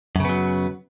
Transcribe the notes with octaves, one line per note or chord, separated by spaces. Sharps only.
F#2 C#3 F#3 B3